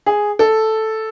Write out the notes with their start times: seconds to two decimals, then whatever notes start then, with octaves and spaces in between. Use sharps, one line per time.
0.06 G#4
0.39 A4